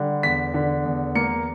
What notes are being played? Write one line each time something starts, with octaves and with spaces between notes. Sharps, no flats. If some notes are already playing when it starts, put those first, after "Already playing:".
Already playing: D3 G3
E2 B6
D3
E2
A#3 C#7